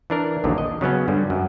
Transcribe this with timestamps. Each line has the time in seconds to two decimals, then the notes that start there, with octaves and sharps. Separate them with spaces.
0.10 E3 D4 A#4
0.44 A#1 D#2 D3 F#3
0.58 D#5
0.81 C#3 F#3 B3 C#4
1.08 G2 D3 G3
1.30 F#2